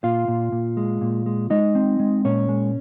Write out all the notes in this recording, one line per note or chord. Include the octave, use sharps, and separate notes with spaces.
A#2 F4 F5
A#2
A#2
G#3
A#2
G#3
G#3 D#4 D#5
C4
G#3
A#2 C#4 C#5
G#3